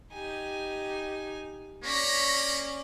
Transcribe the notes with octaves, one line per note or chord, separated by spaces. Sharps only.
D#4 G4 G#5
A#3 C#4 C#5 D5 A#6 B6